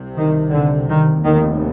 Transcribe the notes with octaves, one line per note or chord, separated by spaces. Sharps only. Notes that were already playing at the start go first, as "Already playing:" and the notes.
Already playing: C2 C3
D#3
D3
D#3
F1 D#2 D#3